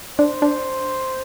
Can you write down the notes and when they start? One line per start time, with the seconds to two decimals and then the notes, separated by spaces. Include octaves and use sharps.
0.18 D4 C5
0.42 D4